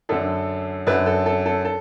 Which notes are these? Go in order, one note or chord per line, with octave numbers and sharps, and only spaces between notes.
F#2 D3 A4
F#2 D3 B4
A4
A4
A4
A4